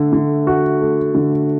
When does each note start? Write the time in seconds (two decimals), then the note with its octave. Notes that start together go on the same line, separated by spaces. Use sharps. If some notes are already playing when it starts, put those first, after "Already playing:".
Already playing: D3 A3
0.13 D3
0.47 F#4
0.81 A3
1.15 D3